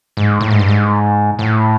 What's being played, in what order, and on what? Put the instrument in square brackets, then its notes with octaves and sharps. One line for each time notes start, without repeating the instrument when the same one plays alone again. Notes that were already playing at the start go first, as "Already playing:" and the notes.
[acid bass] G#2
A2
G#2
G2
G#2
A2